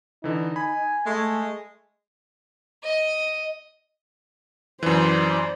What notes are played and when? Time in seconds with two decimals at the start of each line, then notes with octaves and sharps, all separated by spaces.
0.24 D3 E3 D#4
0.56 G#5 B5
1.06 G#3 A3
2.83 D#5
4.83 F#2 E3 C5 D5